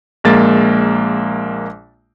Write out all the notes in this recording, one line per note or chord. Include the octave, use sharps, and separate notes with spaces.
A#1 G#3 A#3 A6